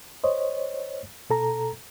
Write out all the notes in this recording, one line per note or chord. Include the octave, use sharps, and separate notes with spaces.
C5 C#5 D#5
B2 A4 A#5